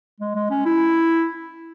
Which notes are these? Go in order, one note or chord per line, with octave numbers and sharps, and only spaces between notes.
G#3
G#3
C#4
E4